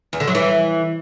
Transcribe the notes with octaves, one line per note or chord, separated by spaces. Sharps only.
E2
D3
F#3
E3